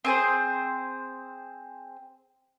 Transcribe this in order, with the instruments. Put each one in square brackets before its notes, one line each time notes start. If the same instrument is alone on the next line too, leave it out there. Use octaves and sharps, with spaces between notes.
[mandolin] C4 G#4 C5